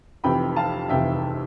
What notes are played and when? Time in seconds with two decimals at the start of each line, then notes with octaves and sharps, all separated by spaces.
0.24 F1 F2 C3 E3 G5 B5
0.56 F5 A5
0.89 F1 F2 C3 E3 E5 G5